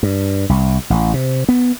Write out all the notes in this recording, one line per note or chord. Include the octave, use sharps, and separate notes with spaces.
G2
C2
A1
C3
B3